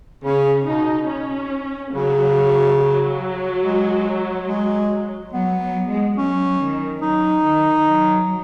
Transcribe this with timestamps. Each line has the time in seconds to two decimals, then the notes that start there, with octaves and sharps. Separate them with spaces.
0.24 C#3 C#4
0.66 B2 D#4
1.08 C#4
1.93 C#3 F#3
2.79 F#3
3.63 G#3
4.47 G#3
5.32 F#3 B3
5.61 F#3
5.89 G#3
6.17 F#3 C#4
6.60 D#3
7.02 F#3 D#4
7.45 D#3
7.87 F#3